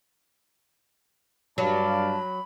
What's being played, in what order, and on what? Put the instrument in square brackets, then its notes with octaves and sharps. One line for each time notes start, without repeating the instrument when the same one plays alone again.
[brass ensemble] G2 D5 F5 [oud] F#3 [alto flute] A5 [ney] B5